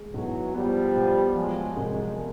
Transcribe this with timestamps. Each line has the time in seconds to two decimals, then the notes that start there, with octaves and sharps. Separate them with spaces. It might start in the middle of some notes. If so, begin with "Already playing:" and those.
Already playing: G#3
0.14 B1 E3 F#3
0.55 F3 G3 B3
0.96 B2
1.36 F3 F#3 G#3
1.77 C2 F#3 G#3